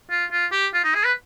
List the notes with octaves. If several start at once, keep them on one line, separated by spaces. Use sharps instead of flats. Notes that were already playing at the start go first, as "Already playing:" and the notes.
F4
F4
G4
F4
D#4
G#4
B4